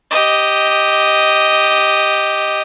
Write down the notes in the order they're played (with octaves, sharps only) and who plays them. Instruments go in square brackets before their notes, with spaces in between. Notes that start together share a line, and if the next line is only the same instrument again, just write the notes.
[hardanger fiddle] G4 D#5